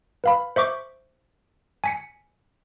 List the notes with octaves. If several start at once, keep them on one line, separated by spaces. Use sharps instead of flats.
B4 F5 B5
C5 E5 C#6 D6
G#5 B6 C#7